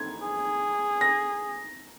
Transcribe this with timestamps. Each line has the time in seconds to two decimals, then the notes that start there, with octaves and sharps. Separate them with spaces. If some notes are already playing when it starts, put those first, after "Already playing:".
Already playing: G#6
0.22 G#4
1.01 A#6